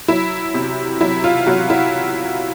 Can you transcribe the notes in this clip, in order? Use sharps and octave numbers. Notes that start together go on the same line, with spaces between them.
F#3 E4
C3
F#3 E4
F4
F#3 F#4
E4